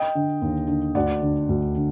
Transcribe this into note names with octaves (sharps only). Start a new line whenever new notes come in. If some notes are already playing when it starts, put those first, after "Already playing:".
Already playing: D#5 G5
D3
D#2
D3
D2 D5 F#5
D3
D2
D3